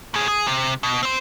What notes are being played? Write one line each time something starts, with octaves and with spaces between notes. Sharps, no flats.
A2 G#4
G#4
C3
B2
C4 C5